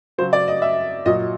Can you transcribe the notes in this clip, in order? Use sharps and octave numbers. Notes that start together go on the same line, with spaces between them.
C#3 F#3 C5
D5
D#5
E5
A#2 F#3 D#5